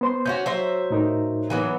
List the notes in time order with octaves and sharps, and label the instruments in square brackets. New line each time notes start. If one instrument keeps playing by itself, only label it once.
[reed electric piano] B3 C5 C6
[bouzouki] C#4 E4 F#4 [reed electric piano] G6
[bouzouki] F#3 C5 E5
[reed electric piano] A2 D#4 A#4
[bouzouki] E3 F#3 B3